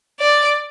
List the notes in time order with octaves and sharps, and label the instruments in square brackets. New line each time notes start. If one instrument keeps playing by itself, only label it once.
[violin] D5